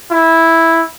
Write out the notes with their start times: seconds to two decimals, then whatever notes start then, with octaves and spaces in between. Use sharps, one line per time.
0.11 E4